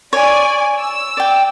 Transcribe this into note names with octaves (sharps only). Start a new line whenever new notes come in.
C#5 D5 G#5
E6
D5 G5